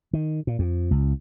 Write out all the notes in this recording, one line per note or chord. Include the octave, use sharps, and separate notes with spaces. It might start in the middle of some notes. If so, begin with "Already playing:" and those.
D#3
A#2
F2
C#2